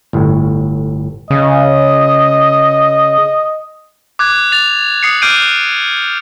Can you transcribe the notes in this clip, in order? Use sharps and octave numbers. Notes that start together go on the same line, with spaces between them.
G1 A2
C#3 D#5
D6 F#6 G#6
D6 A6 F7
D#6 C7 C#7
D6 F6 G6 C7 D7 D#7